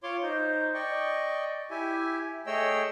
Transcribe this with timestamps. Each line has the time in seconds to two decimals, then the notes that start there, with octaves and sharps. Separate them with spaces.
0.03 F4 C#5 C6 D6
0.23 D#4 C5
0.74 D5 D#5 G5 C#6
1.71 E4 G4 E5 G#5
2.47 A3 G#4 C#5 D#5 G5 E6